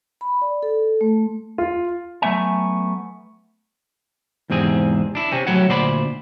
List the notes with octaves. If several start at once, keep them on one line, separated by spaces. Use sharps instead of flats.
B5
D5
A4
A3
F4
F#3 A3 B3 E5 G#5
E2 G#2 C3 C4 G#4
D4 E4
C3 C4 C#4
A2 F#3 E4 C#5 F#5
D2 A#2 C5 D5 G#5 B5